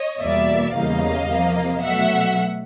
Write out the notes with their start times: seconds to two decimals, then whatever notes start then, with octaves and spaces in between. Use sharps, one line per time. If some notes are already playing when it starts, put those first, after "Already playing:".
Already playing: C#5 D#5
0.20 E2 B2 G3 A#3 D5 E5
0.75 E2 C#3 E3 G3 A#3 D#5 F5
1.30 C3 F3 A#3
1.83 B2 F#3 A3 E5 F#5